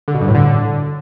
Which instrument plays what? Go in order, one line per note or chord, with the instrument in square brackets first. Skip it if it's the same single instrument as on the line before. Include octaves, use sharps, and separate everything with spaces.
[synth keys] D3
B2
G2
A2
D3